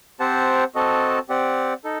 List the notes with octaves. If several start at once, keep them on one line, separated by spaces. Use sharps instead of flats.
C4 G4 C5 F#5 A5
C4 F#4 A4 D#5 A5
C4 G4 D5 F#5
D#4 A4